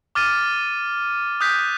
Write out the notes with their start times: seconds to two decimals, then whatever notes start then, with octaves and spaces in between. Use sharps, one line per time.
0.15 D6 F6 A6 D#7
1.40 D#6 F#6 G6 B6